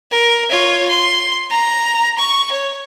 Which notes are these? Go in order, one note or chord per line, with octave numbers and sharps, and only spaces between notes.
A#4
F4 C#5
C6
A#5
C#6
C#5